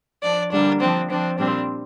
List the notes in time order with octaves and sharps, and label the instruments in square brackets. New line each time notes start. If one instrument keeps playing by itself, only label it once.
[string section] F3 D4 [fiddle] D5
[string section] D3 G3 A#3 [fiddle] D4
[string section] F3 D4 [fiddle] C4
[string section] F3 D4 [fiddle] C4
[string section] A#2 G3 C4 [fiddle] D4